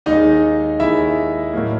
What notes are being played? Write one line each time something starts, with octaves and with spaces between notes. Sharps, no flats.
D#2 D#3 G#3 D#4 D#5
D#2 D#3 G#3 E4 E5
A2 F#3 A#3